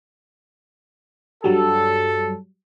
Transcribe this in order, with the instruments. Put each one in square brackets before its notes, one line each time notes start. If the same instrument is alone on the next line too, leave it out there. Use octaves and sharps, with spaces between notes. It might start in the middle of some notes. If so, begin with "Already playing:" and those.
[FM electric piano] G2 F#3 G3 [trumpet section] A4